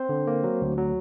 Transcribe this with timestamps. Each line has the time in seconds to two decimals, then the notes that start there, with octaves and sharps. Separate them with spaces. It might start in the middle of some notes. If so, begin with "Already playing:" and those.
Already playing: C4 C5
0.09 D3
0.27 A#3
0.44 F#3
0.62 D2
0.78 F#3